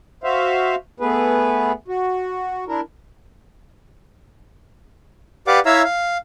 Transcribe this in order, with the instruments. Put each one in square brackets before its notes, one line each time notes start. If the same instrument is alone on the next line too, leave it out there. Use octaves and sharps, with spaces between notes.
[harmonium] F#4 C5 E5 F5
A3 B3 G#4 B4
F#4
D4 E4 A#4
[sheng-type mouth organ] G4 B4 D5 F5 F#5 D6
E4 C#5 E5 F5 A#5 E6
F5